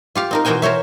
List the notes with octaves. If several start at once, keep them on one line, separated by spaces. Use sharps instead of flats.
F4 G4 F5
C4 D#4 A#4
B2 E3 A#4 C5 G5 G#5
A#4 C5 C#5 E5